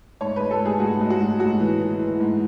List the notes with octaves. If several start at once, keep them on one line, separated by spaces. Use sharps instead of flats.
G#2 C#5
G#3 B4
A4
G#2 G#4
G#2 F#4
G#3
F#4
G#2
G#2 F#4
E3
E3
E3
G#2